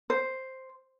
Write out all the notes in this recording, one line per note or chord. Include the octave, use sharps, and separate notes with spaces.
C5